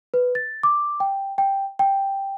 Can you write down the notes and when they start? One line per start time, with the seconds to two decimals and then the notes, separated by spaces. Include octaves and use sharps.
0.14 B4
0.35 A6
0.63 D6
1.00 G5
1.38 G5
1.79 G5